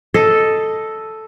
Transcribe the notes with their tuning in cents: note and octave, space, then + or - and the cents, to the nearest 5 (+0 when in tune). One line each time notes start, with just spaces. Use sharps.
A4 +0 D#5 +0